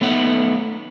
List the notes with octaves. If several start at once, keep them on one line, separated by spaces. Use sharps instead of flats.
A3 B3 D#4 F#5